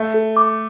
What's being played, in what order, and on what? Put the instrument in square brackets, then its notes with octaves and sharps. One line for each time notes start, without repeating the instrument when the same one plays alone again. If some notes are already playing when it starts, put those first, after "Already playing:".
Already playing: [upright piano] A3 [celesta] E5
[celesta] A4
D6